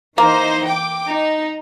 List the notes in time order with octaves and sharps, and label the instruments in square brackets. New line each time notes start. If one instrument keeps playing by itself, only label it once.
[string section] E3 D#4 C5 [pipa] A#3
[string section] G5 D6
D#4